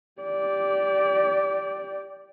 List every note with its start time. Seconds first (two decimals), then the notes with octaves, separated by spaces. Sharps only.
0.21 G4 D5